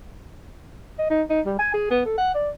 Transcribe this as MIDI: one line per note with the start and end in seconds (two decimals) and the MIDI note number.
0.99 1.09 75
1.10 1.22 63
1.29 1.40 63
1.46 1.58 55
1.59 1.69 80
1.74 1.88 68
1.90 2.02 59
2.06 2.14 69
2.18 2.34 78
2.34 2.50 74